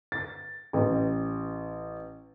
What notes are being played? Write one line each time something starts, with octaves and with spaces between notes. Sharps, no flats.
A6
A1